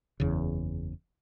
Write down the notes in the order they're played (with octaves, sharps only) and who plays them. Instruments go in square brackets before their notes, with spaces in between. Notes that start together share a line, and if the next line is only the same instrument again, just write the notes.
[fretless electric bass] F#1 E2 C#3